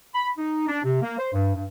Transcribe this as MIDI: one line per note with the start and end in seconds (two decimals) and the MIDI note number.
0.15 0.29 83
0.38 0.67 63
0.68 0.79 62
0.84 0.99 48
1.02 1.19 58
1.19 1.31 72
1.34 1.54 43
1.55 1.64 43